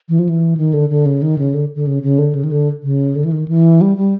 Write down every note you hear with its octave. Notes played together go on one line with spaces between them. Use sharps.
E3
F3
E3
D#3
D3
D3
C#3
D#3
C#3
D3
D3
C#3
C#3
D3
C#3
D#3
D3
C#3
D3
E3
D#3
E3
G3
G3